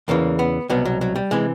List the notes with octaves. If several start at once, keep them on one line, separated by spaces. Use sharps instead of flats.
E2 C#3 E3 A#3
B3
C2 B2 F#3 B3
F#3
F#3
G3
C3 E3 G#3